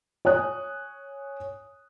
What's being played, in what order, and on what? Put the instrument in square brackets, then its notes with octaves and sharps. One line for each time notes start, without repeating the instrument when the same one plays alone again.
[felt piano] C#5 G#5 D#6 F#6